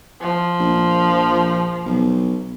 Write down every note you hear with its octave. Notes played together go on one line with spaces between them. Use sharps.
F3
A#1
B1